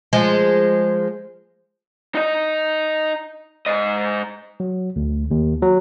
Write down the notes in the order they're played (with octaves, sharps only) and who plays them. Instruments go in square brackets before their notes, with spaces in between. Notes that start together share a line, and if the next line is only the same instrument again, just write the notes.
[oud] F3 G#3
[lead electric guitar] D#4 D#5
G#2 D#5
[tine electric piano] F#3
D2
D#2
F#3